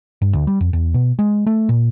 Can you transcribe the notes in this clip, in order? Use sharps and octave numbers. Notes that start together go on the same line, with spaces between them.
G2
D2
G3
F2
E2
B2
G#3
A3
A#2